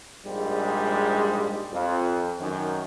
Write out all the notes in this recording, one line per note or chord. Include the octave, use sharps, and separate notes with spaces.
A#1 G#2 G3 G#3
F2
F#2 D#3